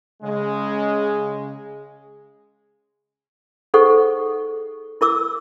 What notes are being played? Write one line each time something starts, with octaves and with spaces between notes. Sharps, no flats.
C#3 G#3
D#4 G#4 A4 C5 F#5 C#6
E4 A#4 D6 E6